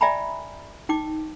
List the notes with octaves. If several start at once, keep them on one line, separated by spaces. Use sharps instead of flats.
D5 E5 G5 G#5 A#5 B5
D#4 G5 D6